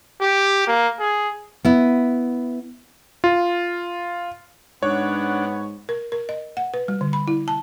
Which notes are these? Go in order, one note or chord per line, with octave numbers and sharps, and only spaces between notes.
G4
A#3
G#4
B3 E4
F4
G#2 B3 D4 C#5 F#5
A#4
A#4
D#5
F#5
B4
G3
D3
B5
E4
A5